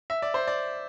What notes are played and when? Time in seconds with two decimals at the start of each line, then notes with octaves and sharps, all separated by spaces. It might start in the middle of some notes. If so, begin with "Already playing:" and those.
0.10 E5
0.22 D5
0.34 C5
0.48 D5